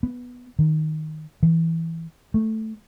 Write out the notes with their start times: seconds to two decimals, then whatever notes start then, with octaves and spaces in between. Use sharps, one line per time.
0.03 B3
0.59 D#3
1.43 E3
2.34 A3